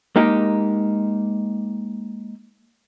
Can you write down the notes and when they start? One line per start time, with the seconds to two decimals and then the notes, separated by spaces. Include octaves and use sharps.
0.16 G#3 A#3 D#4 G4